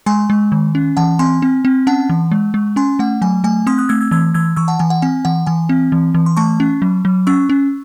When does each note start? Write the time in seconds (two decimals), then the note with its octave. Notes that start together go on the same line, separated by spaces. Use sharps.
0.06 G#3 G#5 C6
0.30 G#3
0.52 D#3
0.75 C#4
0.97 E3 F#5 A5
1.19 C4 G#5 C6
1.42 C4
1.65 C4
1.87 C#4 F#5 A5
2.10 E3
2.32 G#3
2.54 G#3
2.76 C#4 G#5 C6
2.99 A3 F#5
3.22 F#3 G#5
3.44 A3 G#5
3.67 C4 C6 D#6
3.78 D#6 F#6
3.89 A3 E6 G#6
4.01 E6 G#6
4.11 E3 E6 G#6
4.34 E3 E6 G#6
4.56 E3 C#6 E6
4.68 F#5 A5
4.79 E3 G#5
4.90 F#5
5.02 C4 G#5
5.25 E3 F#5
5.46 E3 G#5
5.69 C4
5.92 E3
6.15 E3
6.26 C6
6.37 A3 A5 C#6
6.60 C#4
6.82 F#3
7.05 F#3
7.27 C#4 C#6 E6
7.50 C#4